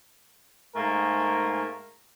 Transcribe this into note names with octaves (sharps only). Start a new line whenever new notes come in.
G#2 A3 A#3 A#4 G#5